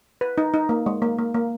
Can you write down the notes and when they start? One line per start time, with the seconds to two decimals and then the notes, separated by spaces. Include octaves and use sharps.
0.21 B4
0.38 D#4
0.54 D#4
0.69 A#3
0.86 G#3
1.02 A#3
1.18 A#3
1.34 A#3